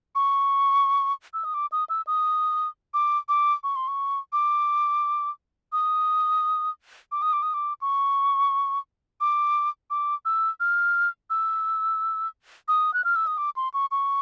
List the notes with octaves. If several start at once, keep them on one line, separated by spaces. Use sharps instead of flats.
C#6
E6
D#6
D6
D#6
E6
D#6
D6
D6
C#6
C6
C#6
D6
D#6
D6
D#6
D6
D#6
D6
C#6
D6
D6
E6
F6
E6
D#6
F#6
F6
E6
D#6
D6
C6
C#6
C#6